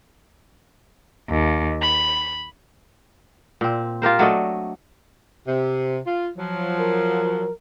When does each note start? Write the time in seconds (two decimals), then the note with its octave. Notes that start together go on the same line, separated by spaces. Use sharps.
1.29 D#2
1.82 B5
3.61 A#2 C4
4.02 F4 G4 A#4 C5
4.19 F#3 A3 D4 D#5
5.47 C3
6.06 F4
6.37 F3 F#3
6.78 A#4